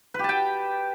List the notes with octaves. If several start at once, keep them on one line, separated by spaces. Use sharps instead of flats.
G4 B4 G5 A5